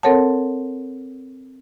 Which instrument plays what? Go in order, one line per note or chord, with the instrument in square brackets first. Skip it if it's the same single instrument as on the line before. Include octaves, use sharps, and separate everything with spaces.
[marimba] C4 A4 A#4 C#5 F#5 A5